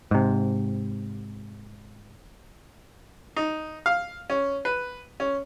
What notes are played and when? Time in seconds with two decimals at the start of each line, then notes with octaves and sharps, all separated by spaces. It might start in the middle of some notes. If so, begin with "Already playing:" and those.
0.11 G#2 C3
3.36 D#4
3.86 F5
4.30 C#4
4.65 B4
5.20 C#4